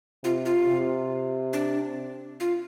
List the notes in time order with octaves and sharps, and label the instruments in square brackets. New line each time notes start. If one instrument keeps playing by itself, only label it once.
[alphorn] C3 [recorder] F4
[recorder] F4
[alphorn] C3
[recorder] D4
F4